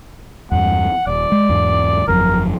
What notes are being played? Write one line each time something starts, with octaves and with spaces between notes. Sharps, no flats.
E2 G2 F#5
D#1 D5
G#3
E2 G#2
G1 F2 F#3 A#4